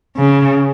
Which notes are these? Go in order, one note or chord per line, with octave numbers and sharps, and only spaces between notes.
C#3